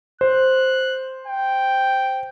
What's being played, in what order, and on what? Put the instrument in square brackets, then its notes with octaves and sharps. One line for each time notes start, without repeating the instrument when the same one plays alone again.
[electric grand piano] C5 [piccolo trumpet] F#6
[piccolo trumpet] G5